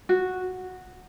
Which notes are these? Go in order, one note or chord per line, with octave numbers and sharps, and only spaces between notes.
F#4